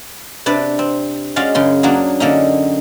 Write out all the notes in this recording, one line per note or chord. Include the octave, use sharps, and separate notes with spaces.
C3 D4 B4 D5
C4
G#3 C#4 F#4 D5 F5
F#2 C#3 C6
F#3 A#3 D4 F#4 G#4
D3 A#3 C#4 D#4